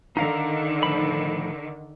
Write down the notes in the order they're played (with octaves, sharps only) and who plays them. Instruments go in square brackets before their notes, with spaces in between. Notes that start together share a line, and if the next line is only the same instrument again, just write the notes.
[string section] D3 D#3 [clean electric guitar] D#4 F5 A#5
[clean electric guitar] A2 F3 B5